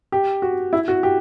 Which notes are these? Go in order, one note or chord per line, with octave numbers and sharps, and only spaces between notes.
G4
F#4
E4
F#4
G4